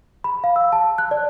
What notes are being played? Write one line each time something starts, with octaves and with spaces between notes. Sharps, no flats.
B5
F5
E6
A5
F#6
D5